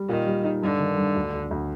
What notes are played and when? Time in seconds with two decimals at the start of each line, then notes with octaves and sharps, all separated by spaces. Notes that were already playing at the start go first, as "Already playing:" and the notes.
Already playing: G3
0.09 A#2 D#3
0.27 G3
0.44 D#4
0.62 G2 D3
0.80 D#3
0.98 G2
1.16 D2
1.33 D2
1.51 D2